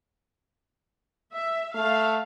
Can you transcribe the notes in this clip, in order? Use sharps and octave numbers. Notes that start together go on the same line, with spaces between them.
E5
A3 F5